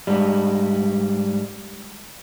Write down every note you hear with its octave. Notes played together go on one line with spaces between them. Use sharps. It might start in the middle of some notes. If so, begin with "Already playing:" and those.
G#2 G3